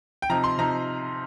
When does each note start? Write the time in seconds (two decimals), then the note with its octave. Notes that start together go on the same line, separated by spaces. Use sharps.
0.22 G5
0.29 C3 F3 D#4 A#5
0.44 C6
0.58 C3 F3 D#4 A#5